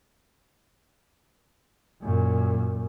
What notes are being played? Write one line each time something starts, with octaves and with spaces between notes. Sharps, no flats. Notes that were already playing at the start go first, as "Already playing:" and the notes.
F#2 A#2